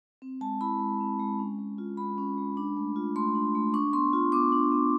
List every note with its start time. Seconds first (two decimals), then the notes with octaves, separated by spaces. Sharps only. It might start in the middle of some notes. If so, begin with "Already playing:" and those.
0.22 C4
0.41 G#3 A5
0.61 E4 B5
0.80 G#3
1.00 C4
1.20 G#3
1.39 C#4
1.58 G#3
1.78 F4
1.97 G#3 B5
2.18 C#4
2.38 G#3
2.57 D4
2.77 A3
2.96 F4
3.16 A3 C6
3.35 D4
3.55 A3
3.74 D4 C#6
3.93 B3 C6
4.13 F4
4.32 B3 D6
4.52 D4
4.72 B3